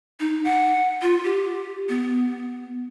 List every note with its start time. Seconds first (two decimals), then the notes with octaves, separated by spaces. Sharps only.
0.20 D#4
0.44 F#5
1.02 F4
1.24 G4
1.89 B3